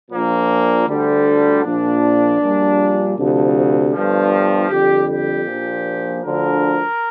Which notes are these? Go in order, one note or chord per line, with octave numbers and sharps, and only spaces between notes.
A#1 A#2 F3 A#3
D2 D3 G3
A#1 A#2 F3 D4
A#1 A#2 G3
D2 C3 F3
G1 G2 F3
F2 D3 G3 G4
G4
A#1 A#2 F3
D2 D3 F3 A#4